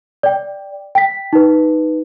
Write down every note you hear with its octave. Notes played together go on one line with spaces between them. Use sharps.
D5 G5
G5 B6
D#4 B4